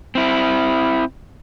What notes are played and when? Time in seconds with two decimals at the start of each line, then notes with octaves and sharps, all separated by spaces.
0.15 C4 E4